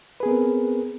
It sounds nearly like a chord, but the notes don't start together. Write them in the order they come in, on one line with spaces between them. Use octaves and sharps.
B4 G#4 B3 A#4 C4